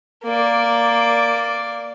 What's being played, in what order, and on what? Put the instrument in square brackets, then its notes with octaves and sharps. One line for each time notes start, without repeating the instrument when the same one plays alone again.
[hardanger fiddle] A#3 D5